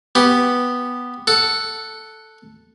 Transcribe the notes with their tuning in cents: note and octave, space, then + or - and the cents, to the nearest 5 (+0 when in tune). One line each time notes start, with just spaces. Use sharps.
B3 +0 G4 +0
A4 +0 F#5 +0